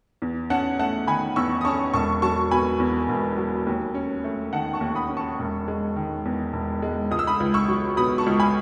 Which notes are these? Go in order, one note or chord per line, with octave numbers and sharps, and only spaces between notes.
E2
C#4 F#5 A5
A3 F#5 A5
D#3 G#5 B5
E2 C#6 E6
D#6
C#4 A5 C#6
E1 A5 C#6
F#3 A5 C#6
B2 G#5 B5
E2
E1
F#3
D#2
C#4
A3
D#3 F#5 A5
A5 C#6
D#2
B5 D#6
C#4
A5 C#6
E1
G#3
D#3
E2
E1
G#3
C#2 D#6
E6
B5 D#6
C#2
C#6 E6
F#3
B2 B5 D#6
A5 C#6
C#2
G#5 B5